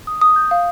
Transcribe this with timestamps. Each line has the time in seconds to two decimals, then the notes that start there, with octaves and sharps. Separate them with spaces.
0.07 D#6
0.21 D#6
0.36 G6
0.51 F5